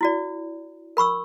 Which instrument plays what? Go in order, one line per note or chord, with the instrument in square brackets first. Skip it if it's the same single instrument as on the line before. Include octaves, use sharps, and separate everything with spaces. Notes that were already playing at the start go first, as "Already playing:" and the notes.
[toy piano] E4 F#4 D5
A#4 B5 C#6 E6